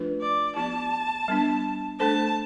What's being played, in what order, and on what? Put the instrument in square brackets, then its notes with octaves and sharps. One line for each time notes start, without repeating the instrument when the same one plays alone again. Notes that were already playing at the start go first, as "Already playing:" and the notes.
Already playing: [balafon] F3 A3 D4 F4 B4
[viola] D5
[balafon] F3 B3 E4 G4 D5 [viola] A5
[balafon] G3 B3 D4
[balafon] A3 D4 A4 C5 [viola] A5